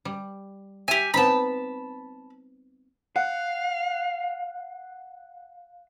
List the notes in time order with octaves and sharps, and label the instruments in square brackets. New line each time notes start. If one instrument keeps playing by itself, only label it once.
[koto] G3
[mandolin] G4 G#5 [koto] E5
[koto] B3 C4 D#4 [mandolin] A5 B5
[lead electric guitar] F5 [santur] F#5